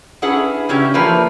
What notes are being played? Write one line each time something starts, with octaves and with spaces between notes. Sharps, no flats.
C#4 D4 E4 G#4 B4 F#5
C#3 C#4 E4 G4
E3 F3 A3 A#3 B4 D5